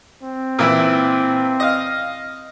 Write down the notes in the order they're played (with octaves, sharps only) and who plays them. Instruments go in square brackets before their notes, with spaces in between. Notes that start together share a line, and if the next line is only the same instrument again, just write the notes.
[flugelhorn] C4
[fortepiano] A#2 E3 E4
D#5 F5